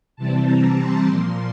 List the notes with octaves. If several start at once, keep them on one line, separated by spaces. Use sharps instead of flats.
C3 E3 G3 C4 A5
A#5
C6
A#2 F3 A#3 C6